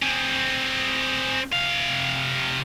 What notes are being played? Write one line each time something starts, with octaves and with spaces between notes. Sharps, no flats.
C4 G#4
C3 F5